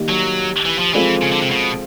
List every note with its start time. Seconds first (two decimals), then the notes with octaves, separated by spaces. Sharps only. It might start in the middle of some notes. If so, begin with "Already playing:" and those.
Already playing: D#3 G3 A#3
0.09 F#3
0.66 E3
0.79 F3
0.94 E3 F3 G#3 C4 F4 A4
1.22 C#3
1.32 D3
1.42 C3
1.51 B2